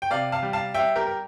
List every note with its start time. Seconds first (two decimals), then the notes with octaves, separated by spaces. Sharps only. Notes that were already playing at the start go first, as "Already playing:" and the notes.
0.02 G5
0.11 C3 D5 F5
0.32 F5 A5
0.43 G3
0.53 F5 A5
0.74 G3 E5 G5
0.96 G4 A#4
1.07 A#4